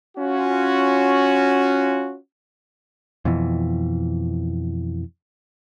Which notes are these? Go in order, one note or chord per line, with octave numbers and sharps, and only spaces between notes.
C#4 F4 F#4
F2 B2 E3